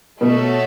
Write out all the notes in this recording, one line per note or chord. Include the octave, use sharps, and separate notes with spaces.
B2 A3 F#4 A4 C#5 E5